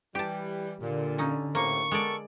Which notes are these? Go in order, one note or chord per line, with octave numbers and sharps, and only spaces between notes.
E3 G3 G4 A5
A#2 D3
C#4 D#4
A2 C3 A#3 C#6
G#3 B3 A4 A#4 D5